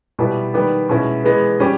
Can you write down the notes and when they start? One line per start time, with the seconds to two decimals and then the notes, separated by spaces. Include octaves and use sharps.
0.19 B2 G3 B3 E4 G4
0.54 D#3 G3 B3 G4
0.89 B2 G#3 C#4 E4
1.24 E3 G#3 B3
1.60 G3 C#4 G4